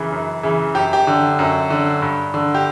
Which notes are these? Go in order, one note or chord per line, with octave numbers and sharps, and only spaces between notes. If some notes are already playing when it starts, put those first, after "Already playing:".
Already playing: F#2 C#3 E3
F#2
C#3 E3
F#2 G4
G4
D3
F#2
D3
G2
D3
G4